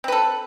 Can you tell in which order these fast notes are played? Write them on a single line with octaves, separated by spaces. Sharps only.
C4 B4 A4